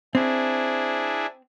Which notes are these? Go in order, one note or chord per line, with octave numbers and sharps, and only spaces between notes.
C4 D4 E4 G#4